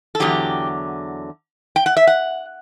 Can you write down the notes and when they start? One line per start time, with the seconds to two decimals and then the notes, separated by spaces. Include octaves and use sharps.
0.15 A4
0.20 E2 D3 F#3 G4
1.76 G5
1.86 F#5
1.97 E5
2.07 F#5